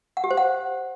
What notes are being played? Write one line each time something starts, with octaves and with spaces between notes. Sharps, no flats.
F#5
G4
C5
F#5